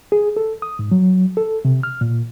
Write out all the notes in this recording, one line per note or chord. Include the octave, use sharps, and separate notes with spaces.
G#4
A4
D#6
G#2
F#3
A4
C3
F6
A#2